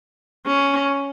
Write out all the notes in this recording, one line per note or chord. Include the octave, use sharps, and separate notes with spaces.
C#4